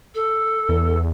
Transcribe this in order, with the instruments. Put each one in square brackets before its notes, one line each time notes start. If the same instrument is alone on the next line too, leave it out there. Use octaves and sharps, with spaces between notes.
[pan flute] A4
[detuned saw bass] E2